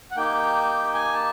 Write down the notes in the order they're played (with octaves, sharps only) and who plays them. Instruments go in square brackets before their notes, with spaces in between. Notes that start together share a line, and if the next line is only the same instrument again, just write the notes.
[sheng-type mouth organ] F#5
A#3 D#4 G4 G5
G#5
A5